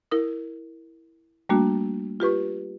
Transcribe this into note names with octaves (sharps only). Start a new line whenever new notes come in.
E4 A#4 D#6
G3 A3 A#3 D4 F#4
F4 G4 B4 C#6